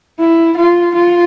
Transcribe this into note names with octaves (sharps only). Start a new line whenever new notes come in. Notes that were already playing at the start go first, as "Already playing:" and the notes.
E4
F4
F4